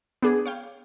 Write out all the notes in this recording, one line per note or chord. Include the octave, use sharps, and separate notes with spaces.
B3 D4 G#4
C#5 F5 G5